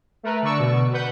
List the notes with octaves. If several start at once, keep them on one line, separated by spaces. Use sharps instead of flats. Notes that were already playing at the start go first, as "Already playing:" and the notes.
A3 A#4 B4
D3 D5 C#6 E6
B2
B4 F#5 G6